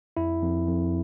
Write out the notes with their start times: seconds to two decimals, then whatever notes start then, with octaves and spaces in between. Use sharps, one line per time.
0.17 F2 E4
0.42 F2
0.67 F2